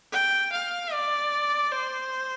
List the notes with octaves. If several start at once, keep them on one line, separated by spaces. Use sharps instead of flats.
G5
F5
D5
C5